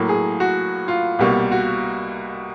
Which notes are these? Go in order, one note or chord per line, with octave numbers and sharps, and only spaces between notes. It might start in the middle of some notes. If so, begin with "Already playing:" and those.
Already playing: A2 F#3 A#3
G#4
F#4
F4
C2 B2 G3 A#3
F#4